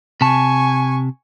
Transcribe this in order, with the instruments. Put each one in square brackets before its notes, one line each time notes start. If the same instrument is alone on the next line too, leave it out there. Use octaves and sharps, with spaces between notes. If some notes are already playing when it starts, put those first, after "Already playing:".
[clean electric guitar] C3 A5 [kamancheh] G#5 C#6